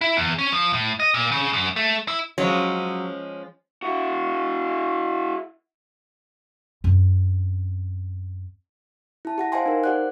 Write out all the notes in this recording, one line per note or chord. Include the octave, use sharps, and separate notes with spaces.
E4
E2
C#4
F3
A2
D#5
A#2
C#3
F#2
A3
E4
F3 F#3 G#3 C#4
E4 F#4
F#2 C4
E4 A5
G4 F#5 A#6
C5 D#5 F5 G5 G#5 C6
D#4 A#4
G4 C5 D5 F#5 F#6